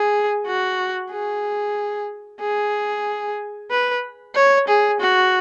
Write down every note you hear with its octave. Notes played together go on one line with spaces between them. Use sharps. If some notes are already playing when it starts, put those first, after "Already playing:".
Already playing: G#4
F#4
G#4
G#4
B4
C#5
G#4
F#4